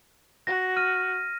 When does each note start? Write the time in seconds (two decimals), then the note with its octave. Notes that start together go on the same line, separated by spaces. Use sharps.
0.47 F#4 A#6
0.77 F6 D#7